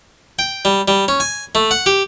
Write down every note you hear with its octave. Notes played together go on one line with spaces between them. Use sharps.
G5
G3
G3
C#4
G#5
A3
F#5
G4